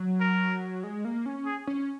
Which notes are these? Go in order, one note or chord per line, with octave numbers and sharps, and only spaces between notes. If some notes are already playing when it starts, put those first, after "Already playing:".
Already playing: F#3
A#4
G#3
A#3
C#4
G#4
C#4